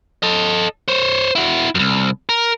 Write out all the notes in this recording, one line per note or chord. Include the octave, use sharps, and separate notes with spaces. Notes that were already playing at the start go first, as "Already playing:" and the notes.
A4 D#5
C5 C#5
E4 F#4
C2 F#2
A#4